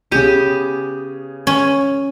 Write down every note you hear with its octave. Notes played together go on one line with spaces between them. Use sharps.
C#3 B3 G4 G#4 D#7
C#4